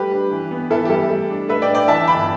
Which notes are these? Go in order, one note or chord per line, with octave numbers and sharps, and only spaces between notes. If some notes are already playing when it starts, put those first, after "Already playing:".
Already playing: G3 A3 G4 B4
D4
E3
B3
E3 E4 A4
G4
G3 E4 A4
A3
D4
A3 B4 E5
D5 G5
D4
D5 G5
E3 E5 A5
G1 G5 B5